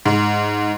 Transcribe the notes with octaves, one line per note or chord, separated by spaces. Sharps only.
G#2